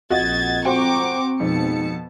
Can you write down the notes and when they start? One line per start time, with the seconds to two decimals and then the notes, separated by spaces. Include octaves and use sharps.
0.10 A#1 F2 F#4 D#5 G#6 A6
0.65 C4 F#4 C5 G5 A#5 C#6 D6
1.40 F2 G#2 B2 A5 C#7